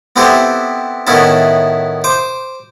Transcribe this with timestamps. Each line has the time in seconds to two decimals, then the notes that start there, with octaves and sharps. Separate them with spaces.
0.16 B3 C4 E4 G4 A4
1.07 A2 D#3 B3 C#4 E4 A5
2.04 C5 D6